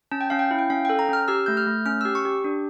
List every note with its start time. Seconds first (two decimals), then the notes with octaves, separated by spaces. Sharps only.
0.12 C#4 A5
0.21 G5
0.30 C#4 F5
0.39 G5
0.51 E4
0.59 G5
0.70 C#4 F5
0.85 G5
0.89 A4
0.99 A#5
1.09 C#4 F6
1.28 G4 E6
1.46 A3 G6
1.57 F6
1.67 A3
1.86 C#4 F6
2.01 E6
2.05 G4
2.15 C#6
2.25 G4
2.44 D4